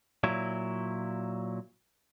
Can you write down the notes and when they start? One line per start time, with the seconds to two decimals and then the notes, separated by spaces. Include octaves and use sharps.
0.24 A#2 F#3 E4